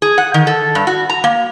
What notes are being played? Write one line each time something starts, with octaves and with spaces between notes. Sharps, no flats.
G#4
F#5
D#3
A4
G2
F#4
A#5
A#3